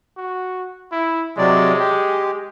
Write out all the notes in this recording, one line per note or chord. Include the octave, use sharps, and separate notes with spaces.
F#4
E4
C3 F#3 G#3 D5
G4